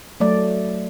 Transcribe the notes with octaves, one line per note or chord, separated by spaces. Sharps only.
F#3 A3 D5